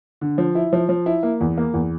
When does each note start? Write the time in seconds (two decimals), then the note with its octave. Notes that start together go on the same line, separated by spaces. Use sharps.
0.21 D3
0.38 F3
0.55 E4
0.73 F3
0.89 F3
1.06 E4
1.23 A#3
1.41 E2
1.57 A#3
1.74 E2